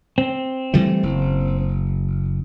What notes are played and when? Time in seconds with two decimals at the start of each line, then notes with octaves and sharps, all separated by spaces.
0.18 C4
0.74 E3 G3 A3
1.03 F#1